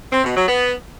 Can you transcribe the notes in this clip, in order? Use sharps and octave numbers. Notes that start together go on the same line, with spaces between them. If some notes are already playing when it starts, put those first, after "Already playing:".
C4
B2
F#3
B3